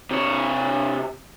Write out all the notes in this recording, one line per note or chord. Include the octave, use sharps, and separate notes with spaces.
C3 C#5